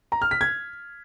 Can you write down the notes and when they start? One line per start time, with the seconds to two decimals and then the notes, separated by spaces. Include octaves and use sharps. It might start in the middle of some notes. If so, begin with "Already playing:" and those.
0.12 A#5
0.22 F6
0.31 B6
0.41 G#6